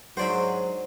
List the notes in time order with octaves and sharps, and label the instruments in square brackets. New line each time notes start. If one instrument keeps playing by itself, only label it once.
[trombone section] G#2 F#3 [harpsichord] G#3 D4 F#4 [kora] C5 D5 E5